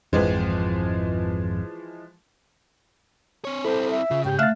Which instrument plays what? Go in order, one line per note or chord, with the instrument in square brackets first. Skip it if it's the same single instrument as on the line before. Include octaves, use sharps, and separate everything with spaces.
[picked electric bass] G#1 F2 [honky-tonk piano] E3 F3 G#3
[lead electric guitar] C4 C#5
[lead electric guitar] C4 E4 [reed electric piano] A4 [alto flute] C5
[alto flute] E5
[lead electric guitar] C#3 [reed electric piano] F4
[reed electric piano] G#2 G4 G6 [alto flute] G5
[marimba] A3 E5 F6 [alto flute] F5 [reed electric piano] F#6 A6